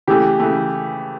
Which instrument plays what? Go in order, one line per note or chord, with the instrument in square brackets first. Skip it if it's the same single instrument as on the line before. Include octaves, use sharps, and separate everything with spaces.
[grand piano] C#3 E3 A3 [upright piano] G4
[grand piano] C#3 E3 A3